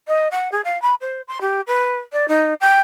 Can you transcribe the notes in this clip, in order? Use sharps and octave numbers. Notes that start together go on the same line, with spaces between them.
D#5
F#5
G#4
F5
B5
C5
C6
G4
B4
D5
D#4
G5